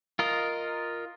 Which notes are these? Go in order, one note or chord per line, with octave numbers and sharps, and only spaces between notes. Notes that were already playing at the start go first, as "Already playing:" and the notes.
F4 A#4 D#5